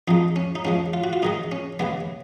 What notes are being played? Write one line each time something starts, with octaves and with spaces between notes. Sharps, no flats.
F2 F3 G#3 D#4
C#4
D#4
G#2 F3 G#3 C#4
F4
F#4
F4
G#2 D#3 G#3 D#4
C#4
D#2 C#3 G#3 B3